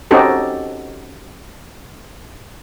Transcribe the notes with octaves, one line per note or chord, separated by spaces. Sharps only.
C4 C#4 D#4 F#4 G4 A4